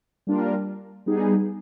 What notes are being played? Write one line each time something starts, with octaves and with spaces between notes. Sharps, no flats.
G3 A#3 D4 F4 A#4
G3 B3 D#4 G#4